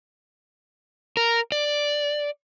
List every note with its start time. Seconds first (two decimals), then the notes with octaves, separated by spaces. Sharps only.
1.17 A#4
1.52 D5